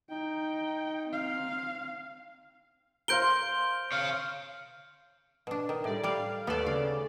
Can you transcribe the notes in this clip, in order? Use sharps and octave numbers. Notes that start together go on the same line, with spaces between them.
D#4 G5
C4 F5
A#4 C5 F5 G6 D7 G7
C#5 F5
B2 D4
D#3
A2 G3 D5
G3 D5 F5
D#2 A3 B3 A4 D5
C#3 D5 F5